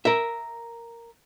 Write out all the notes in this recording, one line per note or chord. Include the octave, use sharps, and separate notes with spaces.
A#4 E5